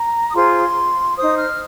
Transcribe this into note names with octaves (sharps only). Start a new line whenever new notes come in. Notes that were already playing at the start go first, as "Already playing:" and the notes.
Already playing: A#5
D#6
F4 G#4 C5 C6
D#4 C5 D#6
F6